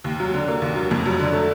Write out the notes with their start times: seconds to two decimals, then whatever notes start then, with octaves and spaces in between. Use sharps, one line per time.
0.04 D#2
0.20 F#3
0.34 D3
0.48 A#3
0.62 D#2
0.76 F#3
0.91 F2
1.06 F#3
1.19 D3
1.33 A3